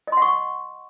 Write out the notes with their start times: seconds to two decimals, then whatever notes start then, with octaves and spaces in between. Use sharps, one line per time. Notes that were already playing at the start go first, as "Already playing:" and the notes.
0.07 D#5
0.12 C6
0.17 F#5
0.22 C#6